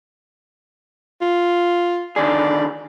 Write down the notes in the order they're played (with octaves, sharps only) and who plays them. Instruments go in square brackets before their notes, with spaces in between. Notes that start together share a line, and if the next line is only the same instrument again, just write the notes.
[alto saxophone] F4
[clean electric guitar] D3 D#3 G#4 [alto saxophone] D5